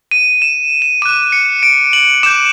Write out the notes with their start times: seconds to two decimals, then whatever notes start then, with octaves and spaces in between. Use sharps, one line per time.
0.11 D#7
0.42 E7
0.82 E7
1.02 D6 F#6 D#7
1.32 C#7
1.63 D7
1.93 F#7
2.23 D6 G6 E7